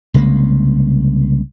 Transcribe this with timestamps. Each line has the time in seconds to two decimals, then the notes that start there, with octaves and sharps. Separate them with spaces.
0.14 C2 C#3 G#3 A#3